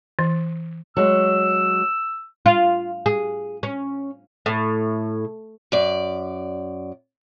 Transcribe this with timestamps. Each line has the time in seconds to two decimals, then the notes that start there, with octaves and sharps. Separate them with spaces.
0.19 E3
0.97 F#3 G#3 E6
2.46 F4
3.06 G#4
3.63 C#4
4.46 A2
5.72 F#2 D5